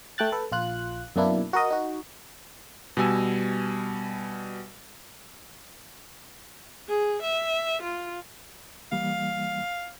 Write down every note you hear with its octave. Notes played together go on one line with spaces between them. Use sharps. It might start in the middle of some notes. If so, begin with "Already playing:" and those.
A3 G5 F#6 A6
A4 B4
A#1 F4 F#6
F#2 B2 A#3 D4 E4
F#4 A#4 D#5
D#4 F#4
B2 G3 G#5 E6
G#4
E5
F4
E3 G3 A#3 F5